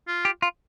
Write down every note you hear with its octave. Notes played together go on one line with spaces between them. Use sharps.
F4
G4
F4